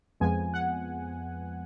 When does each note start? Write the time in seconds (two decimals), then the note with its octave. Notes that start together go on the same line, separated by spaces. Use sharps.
0.20 F2 F3 G#3 B3 G#5
0.54 F#5